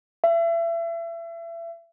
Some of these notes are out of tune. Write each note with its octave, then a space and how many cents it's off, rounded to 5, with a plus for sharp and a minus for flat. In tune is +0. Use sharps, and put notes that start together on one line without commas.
E5 +30